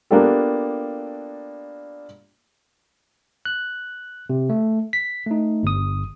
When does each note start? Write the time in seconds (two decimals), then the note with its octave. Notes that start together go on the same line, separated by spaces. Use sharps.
0.11 A#3 B3 D4 F4 G4 A4
3.45 F#6
4.30 C3
4.50 A3
4.93 B6
5.27 A3 D#4
5.63 G1 D#6